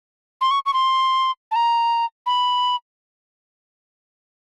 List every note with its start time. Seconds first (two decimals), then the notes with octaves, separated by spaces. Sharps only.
0.41 C6
0.51 C#6
0.66 C#6
0.73 C6
1.51 A5
1.56 A#5
2.26 B5